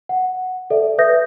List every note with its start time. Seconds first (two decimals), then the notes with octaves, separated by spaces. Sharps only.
0.09 F#5
0.70 A4 D5 E5
0.98 B4 E5 D#6 G6 A#6